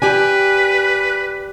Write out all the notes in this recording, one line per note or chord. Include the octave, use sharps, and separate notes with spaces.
G4 B4 D5 G#5